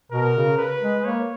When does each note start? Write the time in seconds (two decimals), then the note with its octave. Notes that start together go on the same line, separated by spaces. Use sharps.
0.12 B2 A#4
0.35 C#3
0.58 B4
0.82 G#3
1.05 A#3 C#5